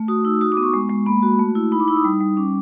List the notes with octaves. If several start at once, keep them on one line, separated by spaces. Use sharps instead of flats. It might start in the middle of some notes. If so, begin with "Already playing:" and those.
Already playing: A3
F#4 D#6
D#4 E6
F#4 D#6
D6
B3
C#6
G#3
G#3
A#3 B5
F#4
A3
E4
D#4 B5
D6
D#4 E6
D#6
G3
G3
C#4 D6